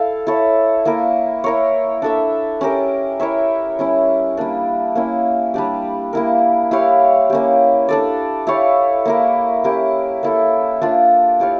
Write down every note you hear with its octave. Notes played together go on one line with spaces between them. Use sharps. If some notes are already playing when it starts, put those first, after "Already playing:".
Already playing: E4 A4 F5
E4 A4 C#5
A#3 E4 A#4
E4 A#4 C#5
D4 A4 E5
C#4 G4 A#4
E4 A#4 C#5 E5
G3 C#4 E4
G3 A#3 D4
A#3 C#4 E4
G3 D4 G4
A#3 E4 A#4
E4 G4 C#5 F5
A#3 C#4 G4
D4 A4 D5
E4 G4 C#5 F5
A#3 E4 A#4
C#4 E4 G4 A#4
A#3 E4 A4
A#3 D4 F4
E4 G4 C#5 F5